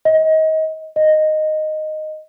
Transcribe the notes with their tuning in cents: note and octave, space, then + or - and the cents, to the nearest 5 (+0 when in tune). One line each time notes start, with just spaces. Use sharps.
D#5 +30
D#5 -5